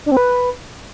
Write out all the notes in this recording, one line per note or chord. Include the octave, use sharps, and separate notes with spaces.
D4
C4
B4